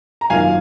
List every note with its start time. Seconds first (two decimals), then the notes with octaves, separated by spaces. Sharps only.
0.21 A#5
0.30 G#1 F#2 D#3 A#3 F4 F5 G#5